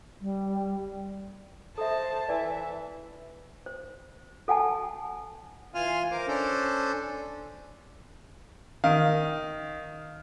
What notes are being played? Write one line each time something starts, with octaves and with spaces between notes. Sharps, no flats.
G3
A4 C5 E5 A5
E3 D5 E5 G#5 A5
C5
A4 F#5 G#5 A5
E3 F4 F5 G#5 C6 F6
A#4 C5 D6
C#4 D4 A4 C5
D#3 F5